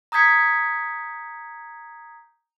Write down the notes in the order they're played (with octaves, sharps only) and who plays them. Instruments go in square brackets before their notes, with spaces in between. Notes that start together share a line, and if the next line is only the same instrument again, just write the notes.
[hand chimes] A#5 D#6 G6 G#6 B6 C#7